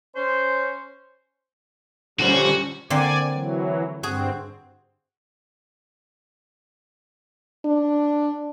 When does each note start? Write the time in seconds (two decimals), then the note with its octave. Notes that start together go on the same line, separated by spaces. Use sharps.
0.15 C#4 C5
2.19 D3 G3 C#4 F4 F#4 C5
2.90 D3 A#3 C4 D5 G#5
3.32 E3 F#3
4.03 G2 C4 F#4 G#4
7.65 D4